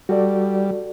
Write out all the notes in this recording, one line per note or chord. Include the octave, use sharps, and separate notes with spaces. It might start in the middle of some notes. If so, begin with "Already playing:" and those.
G3 F#4 A4 D5